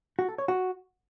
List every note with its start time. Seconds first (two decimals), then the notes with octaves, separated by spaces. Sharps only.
0.19 F#4
0.29 A4
0.38 C#5
0.48 F#4